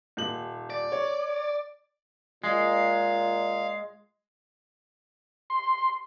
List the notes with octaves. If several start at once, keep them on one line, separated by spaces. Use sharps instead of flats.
D#1 F#7
D5
C#5
A#2 G#3 F5
C6